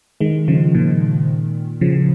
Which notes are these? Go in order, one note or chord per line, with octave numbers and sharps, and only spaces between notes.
D#3 G#3
C#3 F3
A#2 D#3
C#3 F3